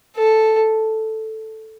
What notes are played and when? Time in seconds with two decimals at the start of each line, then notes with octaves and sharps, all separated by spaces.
0.17 A4